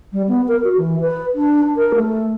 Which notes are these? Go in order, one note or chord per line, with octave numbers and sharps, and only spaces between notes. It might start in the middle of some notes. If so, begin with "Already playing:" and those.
G3
B3
A#4
F#4
E3
B4
D4
A#4
A3